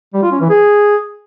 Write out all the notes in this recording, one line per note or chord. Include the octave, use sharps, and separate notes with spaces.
G3
F4
C#4
E3
G#4